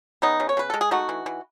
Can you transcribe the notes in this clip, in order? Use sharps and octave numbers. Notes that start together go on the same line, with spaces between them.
C#3 B3 D#4
C#3
C#5
C#3 B4
G#3 A4
G#4
A3 D#4 F#4
E3
E3